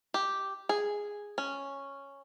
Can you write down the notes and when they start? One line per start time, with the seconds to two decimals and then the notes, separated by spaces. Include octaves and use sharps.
0.14 G4
0.69 G#4
1.38 C#4